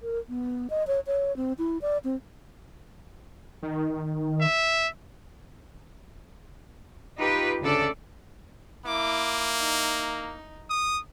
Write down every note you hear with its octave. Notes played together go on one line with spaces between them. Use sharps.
A#4
B3
D#5
C#5
C#5
C4
E4
D5
C4
D#3
E5
D#4 F4 G4 B4
D2 C#3 D4 A4 D5
A#3 E4 D6
D#4
D#6